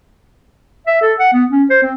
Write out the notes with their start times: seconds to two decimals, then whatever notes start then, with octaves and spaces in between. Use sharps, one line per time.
0.87 E5
1.02 A4
1.19 F#5
1.33 B3
1.51 C#4
1.70 C5
1.82 C4